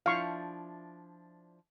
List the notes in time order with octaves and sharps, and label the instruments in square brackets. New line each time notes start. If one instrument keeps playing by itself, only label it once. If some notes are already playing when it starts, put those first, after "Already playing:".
[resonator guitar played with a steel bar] F3 D4 E4 [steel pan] F5 C#6